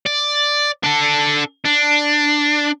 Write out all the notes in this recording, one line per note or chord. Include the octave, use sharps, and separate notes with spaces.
D5
D4 A4
D4